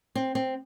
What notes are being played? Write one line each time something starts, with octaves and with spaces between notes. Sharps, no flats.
C4
C4